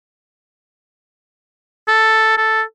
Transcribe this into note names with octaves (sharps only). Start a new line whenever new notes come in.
A4
A4